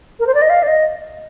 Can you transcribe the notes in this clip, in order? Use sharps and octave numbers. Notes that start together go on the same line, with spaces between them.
A#4
C5
D5
D#5
F5
D5
D#5